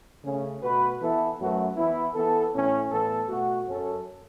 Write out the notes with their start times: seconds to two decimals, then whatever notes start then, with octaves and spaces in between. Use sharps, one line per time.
0.24 C#3 A3 C#4
0.62 B2 A3 F#4 B4
1.01 E3 B3 E4 A4
1.39 F#2 F#3 A3 F#4 B4
1.77 E3 B3 E4
2.15 E3 B3 A4
2.53 A2 E3 C#4
2.91 A2 E3 B3 A4
3.29 B2 A3 F#4
3.67 F#2 F#3 C#4 A4